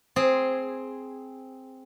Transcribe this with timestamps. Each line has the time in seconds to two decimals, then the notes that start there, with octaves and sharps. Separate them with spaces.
0.16 C4 G#4